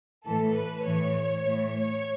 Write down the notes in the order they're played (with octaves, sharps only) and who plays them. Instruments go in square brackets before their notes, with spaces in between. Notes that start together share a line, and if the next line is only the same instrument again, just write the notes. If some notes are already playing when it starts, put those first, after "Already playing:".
[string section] A2 E3 A4
B4
A2 E3 C#5
A2 E3
C#5